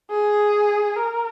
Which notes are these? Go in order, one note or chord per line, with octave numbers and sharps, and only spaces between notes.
G#4
A#4